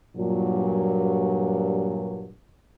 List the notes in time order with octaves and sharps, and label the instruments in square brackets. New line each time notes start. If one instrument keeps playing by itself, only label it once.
[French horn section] G2 A#2 F#3